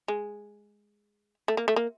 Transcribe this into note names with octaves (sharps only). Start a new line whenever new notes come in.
G#3
A3
A#3
A3
A#3